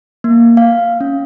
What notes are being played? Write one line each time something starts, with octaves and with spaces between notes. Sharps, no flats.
A#3
F5
C#4